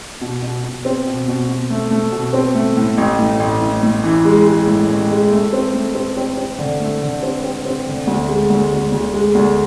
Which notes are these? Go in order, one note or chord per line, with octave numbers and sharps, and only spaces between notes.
B2
B2
B2
C4
B2
B2
B2
A3
A3
B2
C4
A3
A2
A1
A2
A1
A2
A2
E3
G#3
G#3
A2
A1
G#3
A3
C4
A3
C4
C4
C4
D3
A3
D3
C4
C4
C4
D3
D2
G#3
D2
D2
D2
G#3
D2